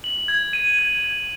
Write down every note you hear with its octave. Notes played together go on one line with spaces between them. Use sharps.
F#7
G#6
D#7
G#6
G#6